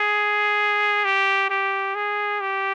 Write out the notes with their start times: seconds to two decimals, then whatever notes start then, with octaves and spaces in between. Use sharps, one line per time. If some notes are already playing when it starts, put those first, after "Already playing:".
Already playing: G#4
1.05 G4
1.50 G4
1.95 G#4
2.40 G4